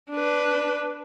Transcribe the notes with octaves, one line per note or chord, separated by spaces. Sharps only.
D4 B4